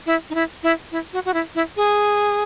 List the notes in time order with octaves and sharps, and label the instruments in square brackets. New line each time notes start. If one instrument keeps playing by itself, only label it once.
[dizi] E4
D#4
E4
E4
E4
F#4
F#4
E4
E4
G#4